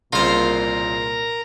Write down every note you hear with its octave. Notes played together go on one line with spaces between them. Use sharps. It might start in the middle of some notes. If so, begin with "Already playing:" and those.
C2 A#2 C#3 A#3 F4 A#4 C5 A#5